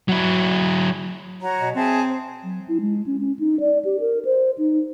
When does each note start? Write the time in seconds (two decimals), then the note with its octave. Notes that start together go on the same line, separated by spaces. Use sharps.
0.09 F#3 E4
1.42 F#4 C#5 A#5
1.60 B2
1.75 C4 G#4 E5 A5
2.08 C5
2.44 F#3
2.68 E4
2.81 G#3
3.06 C#4
3.20 C#4
3.39 D#4
3.60 D5
3.85 G4
4.00 A#4
4.25 C5
4.58 D#4